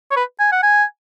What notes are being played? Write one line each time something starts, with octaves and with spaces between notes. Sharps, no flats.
C#5
B4
G#5
F#5
G#5